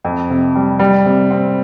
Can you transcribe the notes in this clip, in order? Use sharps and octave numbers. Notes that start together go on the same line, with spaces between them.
F2
C3
G3
G3
C3
C4